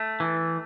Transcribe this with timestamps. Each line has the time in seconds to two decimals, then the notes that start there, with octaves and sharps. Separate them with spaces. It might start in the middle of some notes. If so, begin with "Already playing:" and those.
Already playing: A3
0.20 E3